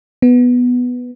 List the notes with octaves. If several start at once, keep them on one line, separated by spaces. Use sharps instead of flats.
B3